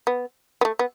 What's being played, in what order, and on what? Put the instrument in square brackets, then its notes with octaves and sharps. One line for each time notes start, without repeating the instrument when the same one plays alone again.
[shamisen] B3
B3
A3
B3